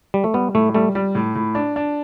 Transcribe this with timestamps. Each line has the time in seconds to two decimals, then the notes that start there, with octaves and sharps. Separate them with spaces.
0.14 G3
0.24 A3
0.34 G3 B3
0.54 A2 A3
0.75 G3 A3
0.95 G3
1.15 A2
1.35 A2
1.55 D4
1.76 D4